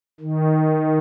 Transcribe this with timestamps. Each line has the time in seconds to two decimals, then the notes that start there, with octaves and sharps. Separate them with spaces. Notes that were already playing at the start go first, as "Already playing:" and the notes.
0.20 D#3